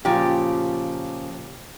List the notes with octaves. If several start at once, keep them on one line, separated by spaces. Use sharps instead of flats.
A#2 C#3 F3 F4 G4